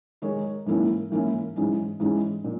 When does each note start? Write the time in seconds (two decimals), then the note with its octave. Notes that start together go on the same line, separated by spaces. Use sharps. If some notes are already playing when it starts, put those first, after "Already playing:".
0.22 D#3 G#3 D#4 A#4 C#5
0.66 G#2 E3 A#3 C#4 E4
1.11 G#2 E3 A#3 C#4 E4
1.56 G#2 E3 G#3 C#4
2.00 G#2 E3 G#3 C#4
2.44 A#2